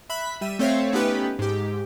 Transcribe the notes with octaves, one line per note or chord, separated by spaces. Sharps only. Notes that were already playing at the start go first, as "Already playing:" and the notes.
E5 B5 F#6 B6
G3 E5 D#7
A3 C4 C5 C#5 E5 F5
A3 B3 C#4 D#4 G4 B4
G#2 G4